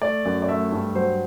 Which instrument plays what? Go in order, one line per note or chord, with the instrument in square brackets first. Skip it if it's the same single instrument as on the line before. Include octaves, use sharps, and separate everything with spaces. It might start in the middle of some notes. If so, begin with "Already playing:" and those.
[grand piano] A3 D5
F#2
D5
A3 E5
G2
F#3 C5